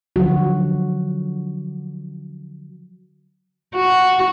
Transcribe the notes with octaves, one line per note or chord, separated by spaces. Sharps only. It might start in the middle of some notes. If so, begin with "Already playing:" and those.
D3 F3 F#3 F#4
F#4